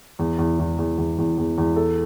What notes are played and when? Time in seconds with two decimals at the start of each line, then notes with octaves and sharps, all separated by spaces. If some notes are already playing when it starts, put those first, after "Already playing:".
0.19 E2
0.39 E2
0.59 E2
0.78 E2
0.98 E2
1.18 E2
1.38 E2
1.58 E2
1.76 A4